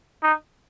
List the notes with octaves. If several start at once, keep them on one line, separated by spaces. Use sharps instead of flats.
D#4